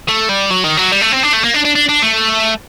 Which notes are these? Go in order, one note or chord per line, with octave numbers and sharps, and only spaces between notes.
A3
G3
F#3
D#3
F#3
G3
A3
C4
D4
A3
A#3
D4
D4
D4
D4
A3